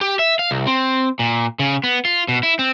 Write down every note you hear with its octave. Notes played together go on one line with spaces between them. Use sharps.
G4
E5
F5
C2
C4
A#2
C#3
B3
F4
B2
E4
C4